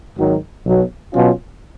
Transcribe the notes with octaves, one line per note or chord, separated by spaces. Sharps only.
G#1 G#2 D#3 F#3
B1 B2 F#3
B2 F#3 C#4 F4